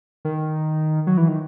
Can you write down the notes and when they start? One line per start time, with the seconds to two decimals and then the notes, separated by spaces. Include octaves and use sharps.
0.25 D#3
1.07 F#3
1.17 E3
1.28 D#3